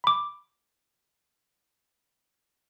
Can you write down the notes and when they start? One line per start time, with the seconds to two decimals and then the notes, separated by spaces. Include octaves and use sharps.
0.04 B5 D6